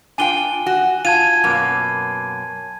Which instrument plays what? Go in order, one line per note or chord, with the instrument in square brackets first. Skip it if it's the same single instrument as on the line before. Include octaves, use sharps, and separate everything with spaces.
[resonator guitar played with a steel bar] D4 F4 G5 [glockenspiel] G#5 D#7 G7
[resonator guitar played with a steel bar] F#4
[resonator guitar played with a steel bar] F4 [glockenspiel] A5 G#6 D#7
[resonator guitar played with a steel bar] F#2 B2 A#3